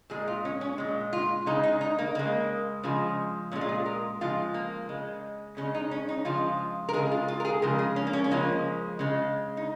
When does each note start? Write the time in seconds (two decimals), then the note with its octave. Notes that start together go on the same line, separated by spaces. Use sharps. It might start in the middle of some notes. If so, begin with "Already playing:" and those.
0.10 A#2 G#3 G#4
0.27 F4
0.45 C#4
0.61 C#4
0.78 A#2 G#3
1.13 F4
1.46 C#3 G#3 D#4
1.63 D#4
1.81 D#4
1.99 A#3
2.15 C#3 G#3 A#3
2.83 C#3 F3 G#3
3.51 A#2 C#4
3.56 G#3
3.61 F4
3.69 G#4
3.86 A#4
4.21 C#3 F3 G#3 F4
4.54 A#3
4.89 C#3 G#3
5.57 C#3 G#3 C#4
5.75 D#4
5.91 C#4
6.09 D#4
6.25 C#3 F3 G#3 F4
6.89 A#4
6.93 G#3 G#4
6.97 C#3
7.12 F4
7.28 F4
7.40 A#4
7.45 G#4
7.62 C#3 F3 G#3 A#4
7.79 G#4
7.96 C#4
8.07 A#3
8.13 C#4
8.24 C#4
8.31 C#3 F3 G#3 A#3
8.99 C#3 G#3
9.57 D#4